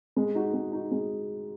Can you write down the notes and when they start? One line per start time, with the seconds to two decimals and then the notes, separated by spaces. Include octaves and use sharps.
0.16 G#3
0.35 D#4 F#4
0.53 G#3
0.72 D#4 F#4
0.91 G#3